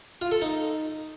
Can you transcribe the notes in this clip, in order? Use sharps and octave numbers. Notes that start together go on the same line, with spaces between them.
F4
A4
D#4